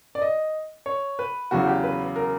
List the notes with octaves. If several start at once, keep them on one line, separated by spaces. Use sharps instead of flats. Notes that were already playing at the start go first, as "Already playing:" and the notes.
D5
D#5
C#5
B4
E2 C#3 F#3 F#4
G4
B4
A#4